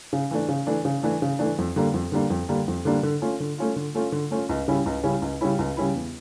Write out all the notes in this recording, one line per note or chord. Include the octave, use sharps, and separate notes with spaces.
C#3
E3 A3 D4
C#3
E3 A3 D4
C#3
E3 A3 D4
C#3
E3 A3 D4
F2
D3 G3 A#3 D4
F2
D3 G3 A#3 D4
F2
D3 G3 A#3 D4
F2
D3 G3 A#3 D4
D3
A3 C#4 F4
D3
A3 C#4 F4
D3
A3 C#4 F4
D3
A3 C#4 F4
C#2
C#3 G3 C#4 E4
C#2
C#3 G3 C#4 E4
C#2
C#3 G3 C#4 E4
C#2
C#3 G3 C#4 E4
E2